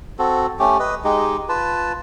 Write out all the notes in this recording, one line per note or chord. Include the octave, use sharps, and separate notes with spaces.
C4 F#4 A4
A3 C#4 G4
B4 D#5
G#3 D#4 G4
F4 B4 A5